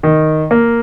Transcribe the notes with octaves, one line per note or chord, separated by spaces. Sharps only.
D#3
A#3